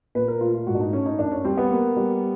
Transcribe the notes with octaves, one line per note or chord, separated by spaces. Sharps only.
A#2 B4
A#4
A3 F4
F4
G#2 F#4
D4
D#4
A3 C#4
D#4
F#2 D4
C#4
G3 C4
B3
A#3
G3